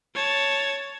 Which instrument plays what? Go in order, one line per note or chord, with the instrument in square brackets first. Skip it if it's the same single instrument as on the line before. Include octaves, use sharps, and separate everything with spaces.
[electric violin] C#5 A5